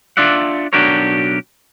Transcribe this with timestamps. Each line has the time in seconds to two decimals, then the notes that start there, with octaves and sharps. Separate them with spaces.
0.17 D4 F4 D5 E5 F#5
0.73 B1 D4 F#4 G4 A#4 C#5